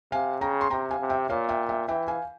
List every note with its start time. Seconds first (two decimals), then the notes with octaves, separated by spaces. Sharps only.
0.12 C3 F5 G#5
0.41 C#3 G5 A#5
0.61 C6
0.70 C3 G5 A#5
0.91 F5 G#5
1.00 C3
1.10 E5 G5
1.29 A#2 C#5 F5
1.49 E5 G5
1.69 E5 G5
1.88 E3 E5 G5
2.08 F5 G#5